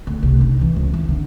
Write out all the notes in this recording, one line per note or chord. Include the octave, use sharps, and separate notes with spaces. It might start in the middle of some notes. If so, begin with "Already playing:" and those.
D2
C2
D#4
E3
C#2
E3
D3